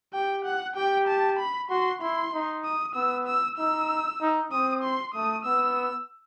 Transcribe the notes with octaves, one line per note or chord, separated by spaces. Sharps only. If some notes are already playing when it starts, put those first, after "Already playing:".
G4 G5
F#5
G4 G5
A5
B5
F#4 C6
E4 C6
D#4
D#6
B3 E6
E6
D#4 E6
D#4
C4 D#6
C6
A3 D#6
B3 E6